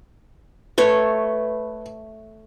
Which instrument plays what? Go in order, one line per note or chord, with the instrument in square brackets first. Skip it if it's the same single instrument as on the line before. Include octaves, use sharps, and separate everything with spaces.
[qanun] A3 C#5 [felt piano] B4